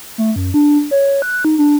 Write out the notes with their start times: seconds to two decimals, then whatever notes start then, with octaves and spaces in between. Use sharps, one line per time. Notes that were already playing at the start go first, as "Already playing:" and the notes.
0.18 A3
0.36 F#2
0.54 D4
0.91 C#5
1.22 F#6
1.45 D#4
1.58 D4